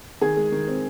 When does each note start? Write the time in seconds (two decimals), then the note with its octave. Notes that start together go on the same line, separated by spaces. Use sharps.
0.21 D#3 G#4
0.37 G#3
0.52 D#3
0.67 C4